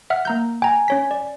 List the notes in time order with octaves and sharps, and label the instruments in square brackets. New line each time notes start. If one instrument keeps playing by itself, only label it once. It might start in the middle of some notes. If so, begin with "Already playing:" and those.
[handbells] E5 F#5 F6
A#3 A#5 G6
[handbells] G5 A#5 [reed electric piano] G#5
[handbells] C#4 C#5 B6
D5